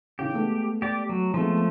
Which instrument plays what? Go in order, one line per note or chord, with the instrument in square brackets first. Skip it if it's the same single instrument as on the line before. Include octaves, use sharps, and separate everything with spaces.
[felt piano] C#3 E3 [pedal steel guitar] G4
[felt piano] G#3 A3 B3
[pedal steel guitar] G4 D5
F#3
[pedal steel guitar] F3 A3 [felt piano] G#3 B3 C4